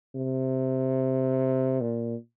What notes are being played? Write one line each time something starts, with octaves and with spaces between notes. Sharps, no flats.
C3
A#2